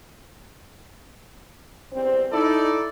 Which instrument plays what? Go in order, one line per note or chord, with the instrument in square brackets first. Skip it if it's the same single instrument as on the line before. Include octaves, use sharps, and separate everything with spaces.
[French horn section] E2 G3 C4
[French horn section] D#4 [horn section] E4 A4 D5